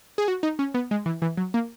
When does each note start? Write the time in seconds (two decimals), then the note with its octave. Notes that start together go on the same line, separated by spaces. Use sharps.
0.18 G#4
0.28 F#4
0.43 D#4
0.59 C#4
0.74 B3
0.91 G#3
1.06 E3
1.22 E3
1.37 F#3
1.54 A#3